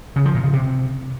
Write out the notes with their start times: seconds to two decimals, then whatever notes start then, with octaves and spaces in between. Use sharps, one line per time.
0.16 C#3
0.25 F3
0.35 A#2
0.44 C#3
0.53 C3